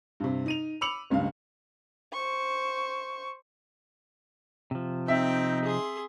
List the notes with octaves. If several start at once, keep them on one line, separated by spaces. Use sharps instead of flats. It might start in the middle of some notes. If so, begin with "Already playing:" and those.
G2 C3
D#4 D#7 F7
B5 D6 E6 C#7 F7 F#7
F#1 C#2 G2 F5
C5 C#6
C3 F3
C4 D#4 E5 G5
G#4 C6